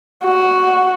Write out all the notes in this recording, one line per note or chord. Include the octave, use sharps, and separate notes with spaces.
F#4